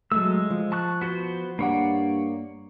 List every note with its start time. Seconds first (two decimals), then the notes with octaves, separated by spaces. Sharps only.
0.12 F#3 G#3 A3 E6
0.50 F3
0.72 A5 C#6 F#6
1.01 B3 F#4 C5
1.59 G2 A#3 C#5 D5 F#5 B5